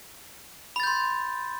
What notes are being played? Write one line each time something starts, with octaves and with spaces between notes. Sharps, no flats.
B5 C6 G6 A6